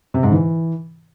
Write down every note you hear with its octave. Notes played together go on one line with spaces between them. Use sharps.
C3
G#2
E3